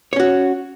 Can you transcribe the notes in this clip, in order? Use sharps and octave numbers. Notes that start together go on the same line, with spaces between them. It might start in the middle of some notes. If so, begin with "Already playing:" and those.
C#4 F#4 C#5